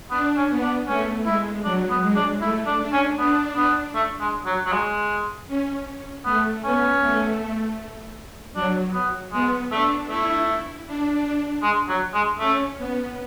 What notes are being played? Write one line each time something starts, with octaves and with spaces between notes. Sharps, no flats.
B3 D4
C#4
B3
D4
A3 C#4
G#3 E4
F#3 D4
B3
G#3
D4
A3 E4
D4
D4
C#4
B3 D4
B3
A3
G#3
F#3
F#3
G#3
C#4
A3 B3
B3 C#4
A3
F#3 D4
B3
G#3 B3
A3 D4
A3 E4
D4
G#3
F#3
G#3
A3 C#4
B3